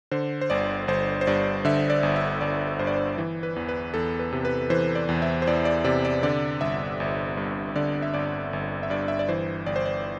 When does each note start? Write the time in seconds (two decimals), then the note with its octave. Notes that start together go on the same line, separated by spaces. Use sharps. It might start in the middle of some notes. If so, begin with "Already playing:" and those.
0.12 D3 C5
0.41 C5
0.50 G1 D5
0.88 G1 C5
1.21 C5
1.27 G2 D5
1.65 D3 E5
1.90 D5
2.03 G1
2.16 E5
2.41 G1 D5
2.79 G2 C5
2.87 D5
2.95 C5
3.18 E3
3.43 B4
3.56 E2
3.69 B4
3.94 E2 A4
4.19 B4
4.32 C3
4.45 B4
4.70 E3 C5
4.95 D5
5.09 E2
5.22 E5
5.42 C5
5.47 E2 D5
5.65 D5
5.84 C3 D5
6.05 D5
6.23 D3 D5
6.61 G1 E5
7.00 G1
7.37 G2
7.76 D3 D5
8.02 E5
8.14 G1 D5
8.53 G1
8.83 E5
8.90 G2 D5
9.08 E5
9.19 D5
9.29 E3 C5
9.66 G1 D5
9.76 C5
9.85 D5